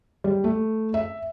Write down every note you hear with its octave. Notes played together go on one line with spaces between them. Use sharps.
G3
A3
E5